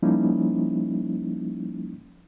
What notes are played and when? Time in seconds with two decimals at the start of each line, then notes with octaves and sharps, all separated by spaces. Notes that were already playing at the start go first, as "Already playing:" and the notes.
0.02 F3 G3 A#3 C#4 D#4 E4